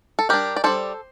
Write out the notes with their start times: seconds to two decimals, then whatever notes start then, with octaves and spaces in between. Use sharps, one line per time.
0.19 A4
0.29 G3 D4 G4 A#4
0.56 D5
0.64 G3 D4 A4 C5